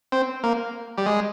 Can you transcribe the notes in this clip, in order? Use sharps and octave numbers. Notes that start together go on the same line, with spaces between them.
C4
A#3
G3
G#3